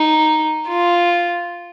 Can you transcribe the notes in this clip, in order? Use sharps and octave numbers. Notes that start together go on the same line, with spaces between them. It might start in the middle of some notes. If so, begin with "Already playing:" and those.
Already playing: D#4
F4